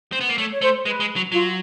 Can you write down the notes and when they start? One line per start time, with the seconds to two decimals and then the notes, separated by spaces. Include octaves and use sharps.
0.12 C4
0.21 B3
0.29 A#3
0.38 A3 C#5
0.51 C#5
0.62 A3 C5
0.85 G#3 B4
1.00 G#3
1.16 F#3
1.32 F#3 F4